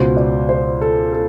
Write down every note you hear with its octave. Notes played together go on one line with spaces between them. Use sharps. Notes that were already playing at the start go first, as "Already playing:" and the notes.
Already playing: C#2 B2 C5
D5
C5
A4
A4